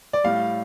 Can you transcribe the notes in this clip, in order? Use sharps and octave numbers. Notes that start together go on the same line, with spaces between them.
D5
A2 G3 F5